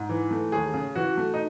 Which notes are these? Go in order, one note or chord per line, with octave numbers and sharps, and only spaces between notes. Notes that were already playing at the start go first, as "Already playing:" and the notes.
Already playing: G#2
E3
A3
D#2 G#4
C#3
E3 F#4
A3
D#4